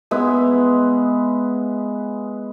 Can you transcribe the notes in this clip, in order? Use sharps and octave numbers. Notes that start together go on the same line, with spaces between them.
G#3 B3 E4